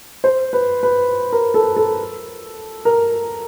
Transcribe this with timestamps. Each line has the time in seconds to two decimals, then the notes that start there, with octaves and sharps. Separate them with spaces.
0.24 C5
0.53 B4
0.83 B4
1.33 A#4
1.54 A4
1.77 A4
2.85 A#4